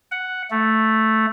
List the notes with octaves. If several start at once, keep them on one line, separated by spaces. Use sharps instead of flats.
F#5
A3